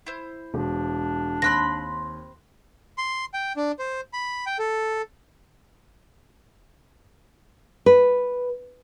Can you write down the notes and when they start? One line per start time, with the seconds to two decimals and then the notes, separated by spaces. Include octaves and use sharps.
0.06 E4 C5
0.54 E1 D4
1.42 D#2 C4 B5 C6 F#6 A#6
2.98 C6
3.34 G5
3.57 D4
3.79 C5
4.13 B5
4.46 G5
4.59 A4
7.86 B4